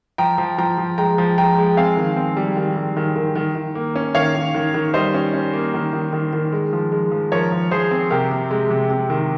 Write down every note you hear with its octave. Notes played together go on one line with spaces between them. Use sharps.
F3 G5 A#5
F3
F3 G5 A#5
F3
G#3 G5 A#5
F3
G#3 G5 A#5
G#3
C4 F5 G#5
D#3
C4
G3
D#3
G3
D#3
D#3
D#3
D#3
A#3
C#4
D#3 C#5 F5
D#3
D#3
D#3
G3 C5 D#5
C#4
C#4
A#3
D#3
D#3
D#3
D#3
G#3
F3
G#3
F3
F3 A#4 C#5
F3
F3 G#4 C5
C4
C3 G4 A#4
C3
G#3
C3
C3
D#3